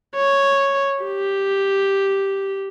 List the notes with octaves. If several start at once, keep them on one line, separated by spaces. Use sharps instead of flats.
C#5
G4